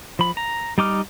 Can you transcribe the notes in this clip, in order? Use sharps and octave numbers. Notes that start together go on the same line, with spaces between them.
F3 B5
A#5
G3 D#4 D6 F6